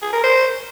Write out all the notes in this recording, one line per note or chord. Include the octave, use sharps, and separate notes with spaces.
G#4
A#4
C5